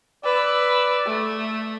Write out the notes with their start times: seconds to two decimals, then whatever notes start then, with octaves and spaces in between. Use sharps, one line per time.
0.24 B4 D5 E6
1.06 A3